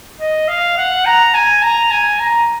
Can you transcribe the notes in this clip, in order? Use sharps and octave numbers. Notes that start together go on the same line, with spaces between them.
D#5
F5
F#5
A#5
G#5
A#5
G#5
A#5